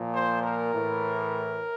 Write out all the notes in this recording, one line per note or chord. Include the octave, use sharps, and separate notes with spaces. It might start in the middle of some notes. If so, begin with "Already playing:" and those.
Already playing: A#2 F3
C5
A#4
A2 E3